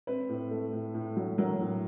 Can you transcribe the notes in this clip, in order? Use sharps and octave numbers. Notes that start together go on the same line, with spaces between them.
C4 B4
A2
A3
A2
A2
F#3
F#3 A#4
A2